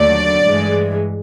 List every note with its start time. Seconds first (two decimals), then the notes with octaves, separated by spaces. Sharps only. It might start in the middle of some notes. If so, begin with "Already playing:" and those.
Already playing: D#2 D3 F#3 A3 D5
0.43 G2 E3 G#3